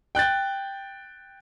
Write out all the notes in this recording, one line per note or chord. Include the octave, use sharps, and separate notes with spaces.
G5 F#6 G6 A6